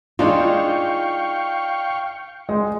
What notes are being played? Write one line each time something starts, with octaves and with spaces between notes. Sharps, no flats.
G#3 D4 D#4 F4 F5 G5 C#6
G#3